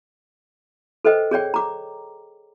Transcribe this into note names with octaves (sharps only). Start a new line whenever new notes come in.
A4 B4 C5 D#5 G5
G#4 C#5 D5 G5
A#5 D6